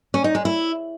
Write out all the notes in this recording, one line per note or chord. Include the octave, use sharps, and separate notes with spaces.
C#4
D#4
G#3
E4